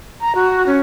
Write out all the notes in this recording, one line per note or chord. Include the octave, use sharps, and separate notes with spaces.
A#5
F#4
C#4